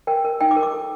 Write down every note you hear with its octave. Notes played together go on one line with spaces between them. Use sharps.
A#4 G5
A#4
D#4 G5
D6
A#4
D6
A4